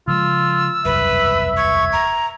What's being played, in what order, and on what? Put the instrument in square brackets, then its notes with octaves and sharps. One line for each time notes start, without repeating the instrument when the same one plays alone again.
[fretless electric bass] C#3 F3 G#3 [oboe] F4 [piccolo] E6
[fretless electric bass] E1 C2 F#2 [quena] B4 [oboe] E5
[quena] C#6 [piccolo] G#6
[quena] A#5